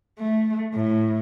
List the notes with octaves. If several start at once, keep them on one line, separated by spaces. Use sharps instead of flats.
A3
A2